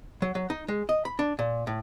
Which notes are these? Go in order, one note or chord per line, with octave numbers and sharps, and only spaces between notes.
F#3
F#3
D#4
G#3
D#5
B5
D4
A#2
A2